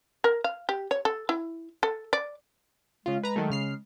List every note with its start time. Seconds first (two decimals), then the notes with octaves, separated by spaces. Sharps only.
0.24 A#4
0.44 F5
0.69 G4
0.91 C#5
1.05 A4
1.29 E4
1.83 A4
2.13 D5
3.06 C#3 G#3 F4
3.23 B4 A#5
3.36 D#3 F#3 A3
3.50 C#3 F6 C7